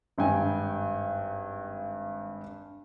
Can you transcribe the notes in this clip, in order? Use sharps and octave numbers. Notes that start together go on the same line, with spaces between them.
G#1 G2 G3 G5 G#5